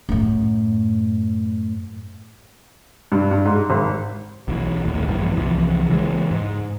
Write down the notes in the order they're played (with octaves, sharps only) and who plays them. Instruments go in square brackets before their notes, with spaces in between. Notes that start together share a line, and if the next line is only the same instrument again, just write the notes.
[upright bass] F#2 A2
[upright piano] G2
G2
G#2
G#1
[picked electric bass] B1 E3
D#1 A1
A#1 G2 E3
C2 E3 F3
C#3 E3 G#3
G#2